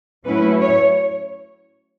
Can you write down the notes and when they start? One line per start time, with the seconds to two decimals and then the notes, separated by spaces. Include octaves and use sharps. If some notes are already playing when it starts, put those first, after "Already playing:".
0.25 F#3 A3 C#4 E4 B4
0.61 C#5